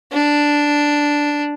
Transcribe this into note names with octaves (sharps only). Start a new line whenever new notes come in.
D4